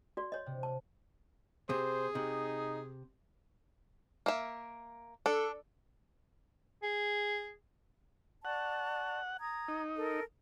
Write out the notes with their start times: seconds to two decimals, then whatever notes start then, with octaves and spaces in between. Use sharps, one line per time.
0.17 F#4 D5
0.32 C#5 D#5
0.46 C3
0.63 A5
1.70 C3 G#4 C5
2.15 C3 D#4
4.26 A#3 E5
5.26 D4 A4
6.83 G#4
8.45 D5 F#5 A5 C#6
9.40 A#5 D#6 G#6
9.68 D#4
9.96 A4 A#4